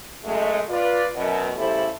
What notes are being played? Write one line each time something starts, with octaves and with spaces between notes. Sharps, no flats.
F#2 G#3 A3
F4 B4 D5
F#2 B2
C#3 G3 A3 E4 A4 C5